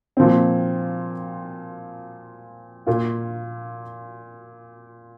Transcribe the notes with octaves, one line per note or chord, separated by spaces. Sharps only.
A#2 F3 C4
A#2 A#3 F4